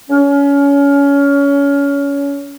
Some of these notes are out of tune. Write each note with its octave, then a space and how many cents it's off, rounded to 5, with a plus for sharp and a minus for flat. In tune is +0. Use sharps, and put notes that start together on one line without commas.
C#4 +25